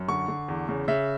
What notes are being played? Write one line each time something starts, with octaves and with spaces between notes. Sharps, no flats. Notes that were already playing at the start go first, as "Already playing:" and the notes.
Already playing: F#2
D3 C#6
D3
E2
C#3
C#3 E5